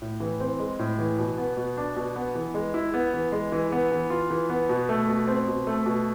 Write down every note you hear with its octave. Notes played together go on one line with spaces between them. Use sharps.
A2
E3
C4
G#3
A2
E3
B2
B3
B2
D4
B2
B3
E3
G#3
E4
B3
E3
G#3
E3
B3
E3
F4
E3
B3
B2
A3
B2
C4
B2
A3
B2